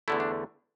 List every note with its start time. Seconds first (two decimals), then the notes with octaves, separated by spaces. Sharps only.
0.08 E2 D3 A3 E4
0.20 D4